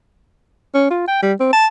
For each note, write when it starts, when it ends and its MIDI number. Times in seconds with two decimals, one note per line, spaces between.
0.74 0.88 61
0.91 1.07 65
1.07 1.20 79
1.22 1.33 55
1.40 1.51 60
1.53 1.67 81